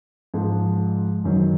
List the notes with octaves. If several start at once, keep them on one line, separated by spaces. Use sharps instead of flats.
G#2 F3 G#3
F#2 D#3 F#3